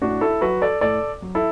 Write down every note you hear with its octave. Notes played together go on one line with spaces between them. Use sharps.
A2 D4 F#4
E4 A4
F#3 F#4 B4
A4 D5
A2 A4 D5
F#3
E4 A4